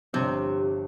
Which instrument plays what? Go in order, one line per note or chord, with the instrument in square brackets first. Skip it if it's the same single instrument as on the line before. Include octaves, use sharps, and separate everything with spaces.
[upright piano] G1 G2 F3 [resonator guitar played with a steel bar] C3